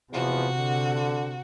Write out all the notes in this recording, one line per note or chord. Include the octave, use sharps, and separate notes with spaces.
E2 C3 F3 B3 F#4
D3